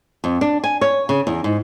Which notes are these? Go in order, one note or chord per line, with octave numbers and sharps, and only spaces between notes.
F2
D4
G#5
C#5
C#3
E2
G#2